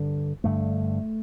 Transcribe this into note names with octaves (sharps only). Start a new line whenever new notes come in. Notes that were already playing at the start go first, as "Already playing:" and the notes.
Already playing: G2 D3
G2 D3 A3